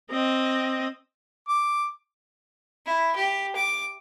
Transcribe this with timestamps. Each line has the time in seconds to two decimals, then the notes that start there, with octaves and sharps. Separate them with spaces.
0.11 C4 D#5
1.49 D6
2.86 E4
3.16 G4
3.56 D6